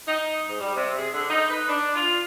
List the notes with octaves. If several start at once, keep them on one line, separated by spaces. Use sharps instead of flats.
D#4
G#2
G3
C3
G#4
D3
D#4
B4
D4
F4